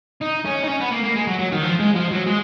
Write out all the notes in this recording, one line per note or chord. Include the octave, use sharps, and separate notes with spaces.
D#4
C#4
D#4
C#4
B3
A#3
A#3
G#3
F#3
F#3
D#3
F3
G#3
F3
F#3
G#3